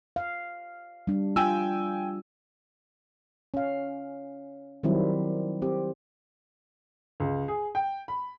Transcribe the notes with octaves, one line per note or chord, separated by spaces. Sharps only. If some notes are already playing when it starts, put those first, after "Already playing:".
F5
G3 D4
F4 G5 G#5 E6
C#4 F5
D#3 F#3 G3 C4 E4
C4 G4
C#2
G#4
G5
B5